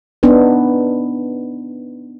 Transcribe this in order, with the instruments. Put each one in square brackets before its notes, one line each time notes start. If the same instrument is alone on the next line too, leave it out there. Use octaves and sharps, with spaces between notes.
[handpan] B3 D4 D#4 B4